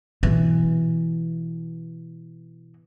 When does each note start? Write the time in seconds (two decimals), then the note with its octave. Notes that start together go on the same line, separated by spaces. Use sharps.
0.23 B2 E3